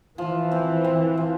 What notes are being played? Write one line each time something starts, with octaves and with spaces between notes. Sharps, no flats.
E3 F3
C4
C4
F3